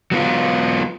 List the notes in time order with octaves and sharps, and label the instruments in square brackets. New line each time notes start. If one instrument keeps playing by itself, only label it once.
[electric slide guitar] F#3 B3 F4